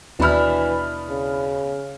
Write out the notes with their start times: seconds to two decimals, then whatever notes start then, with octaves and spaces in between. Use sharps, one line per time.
0.20 D#2 B2 E3 D4 E4 B5 F6
1.10 C#3